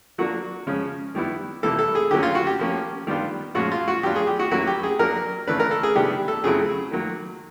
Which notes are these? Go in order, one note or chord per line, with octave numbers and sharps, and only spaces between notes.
F#3 A#3 D4 F#4
C#3 F3 G#3 C#4
D#3 G3 B3 E4
C3 E3 G3 A#3 A4
A4
G#4
D3 F#3 A#3 C#4 G4
F4
F#4
G4
F3 A#3 C#4
D#3 G3 B3 D4 F4
A#2 F3 G#3 C#4 F4 F#4
F4
F#4
F#3 B3 D4 F4 G4
G#4
G4
F#4
F#3 A#3 C#4 E4 F#4
G4
G#4
F#3 A#3 D4 A#4
C#3 E3 A3 D4 B4
A#4
A4
G#4
C3 D#3 G3 B3 D4 G4
A4
C#3 F#3 A3 C4 E4 G#4
D#3 F#3 A#3